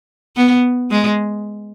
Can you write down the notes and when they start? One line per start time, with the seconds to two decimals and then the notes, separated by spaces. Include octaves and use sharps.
0.36 B3
0.91 G#3